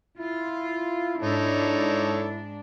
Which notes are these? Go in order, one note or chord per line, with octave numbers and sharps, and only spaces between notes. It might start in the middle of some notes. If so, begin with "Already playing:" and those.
E4 F4
G#2 D4 D#4 A4 C#5